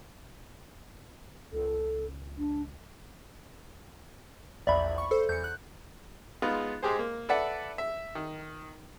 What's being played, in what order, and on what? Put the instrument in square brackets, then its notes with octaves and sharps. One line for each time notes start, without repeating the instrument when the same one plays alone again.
[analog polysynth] C#2 [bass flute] A4
[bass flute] D4
[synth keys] A#1 E2 [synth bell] D5 E5 B5
[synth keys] C#6
[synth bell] A4 [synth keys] C5
[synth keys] E2 C#7 [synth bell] G6
[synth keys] F#6
[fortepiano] G#3 B3 D#4 F4
G#2 G#3 G4 G#4 C5
A#3
A4 B4 D5 E5 F#5
E5
D#3